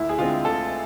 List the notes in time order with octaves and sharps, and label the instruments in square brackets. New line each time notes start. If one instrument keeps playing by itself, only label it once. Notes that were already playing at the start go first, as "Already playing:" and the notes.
Already playing: [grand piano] D2 E4
G#4
D3 G#3 C4 F4
D2 A4